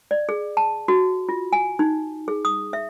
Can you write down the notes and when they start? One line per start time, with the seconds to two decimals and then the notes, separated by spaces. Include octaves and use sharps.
0.11 D5
0.29 G#4
0.57 A5
0.88 F#4
1.29 F4
1.53 G#5
1.79 D#4
2.28 G#4
2.45 D#6
2.73 E5